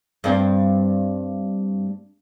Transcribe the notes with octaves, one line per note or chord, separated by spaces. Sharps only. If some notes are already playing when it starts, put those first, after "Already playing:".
G2 C4